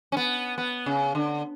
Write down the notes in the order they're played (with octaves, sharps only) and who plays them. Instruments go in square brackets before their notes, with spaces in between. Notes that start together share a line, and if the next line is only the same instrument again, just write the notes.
[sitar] C#4
B3
B3
C#3
D3